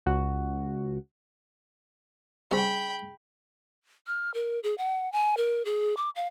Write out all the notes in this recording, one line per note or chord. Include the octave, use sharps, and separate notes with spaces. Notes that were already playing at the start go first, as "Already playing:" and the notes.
C#2 F#4
C#3 G3 C4 G5 B5
F6
A#4
G#4
F#5
G#5
A#4
G#4
D6
F5